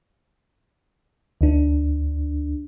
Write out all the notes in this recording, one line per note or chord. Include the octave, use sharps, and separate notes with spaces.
D2 D4